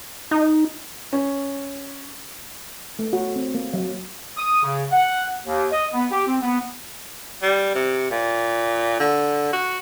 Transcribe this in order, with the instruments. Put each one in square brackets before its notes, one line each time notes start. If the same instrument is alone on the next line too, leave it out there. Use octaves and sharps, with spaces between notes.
[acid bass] D#4
[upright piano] C#4
[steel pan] A3
F#4
C4
A#3
F#3
[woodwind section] D#6
C#3
F#5
D#2
D#5
B3
G4
C4
B3
[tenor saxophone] G3
C3
A#2
D3
F#4